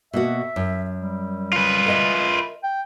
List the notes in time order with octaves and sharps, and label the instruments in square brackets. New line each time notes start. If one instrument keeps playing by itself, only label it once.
[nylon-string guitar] B2 A#3 F#4 [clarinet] E5
[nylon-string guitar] F#2
[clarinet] G3
[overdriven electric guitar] F4 B4
[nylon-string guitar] A#4 D#5 E5
[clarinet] G5